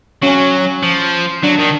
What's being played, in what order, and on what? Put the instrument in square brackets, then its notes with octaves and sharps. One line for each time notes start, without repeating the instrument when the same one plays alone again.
[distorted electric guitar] F#3 [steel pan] C#4
[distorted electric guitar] F3
[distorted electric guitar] F#3 [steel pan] D4
[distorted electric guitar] D#3